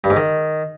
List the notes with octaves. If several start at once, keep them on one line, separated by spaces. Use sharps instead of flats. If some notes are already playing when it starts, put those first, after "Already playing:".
G2
G#2
D#3